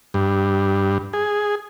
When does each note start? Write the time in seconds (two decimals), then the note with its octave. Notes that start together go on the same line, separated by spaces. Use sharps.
0.14 G2
1.13 G#4